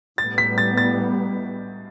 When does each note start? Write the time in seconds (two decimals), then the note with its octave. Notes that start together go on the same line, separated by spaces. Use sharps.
0.18 A2 G3 B3 A6
0.38 B6
0.58 A6
0.78 A6